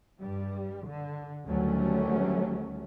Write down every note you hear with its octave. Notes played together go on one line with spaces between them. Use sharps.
G2 G3
D3
D2 D#3 F#3 G3 A3 C#4